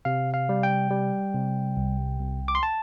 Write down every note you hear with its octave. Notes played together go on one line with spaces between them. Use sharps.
C3 F5
F5
G3
G5
G3
C3
C2
C2
D6
C6
A5